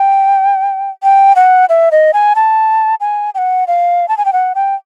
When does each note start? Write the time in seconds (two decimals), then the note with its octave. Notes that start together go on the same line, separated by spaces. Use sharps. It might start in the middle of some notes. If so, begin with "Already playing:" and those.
Already playing: G5
1.03 G5
1.36 F#5
1.69 E5
1.92 D#5
2.13 G#5
2.36 A5
3.00 G#5
3.35 G5
3.38 F#5
3.68 F5
4.08 A5
4.18 G#5
4.25 G5
4.33 F#5
4.55 G5